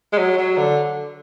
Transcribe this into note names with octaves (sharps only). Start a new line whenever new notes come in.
G#3
F#3
F#3
D3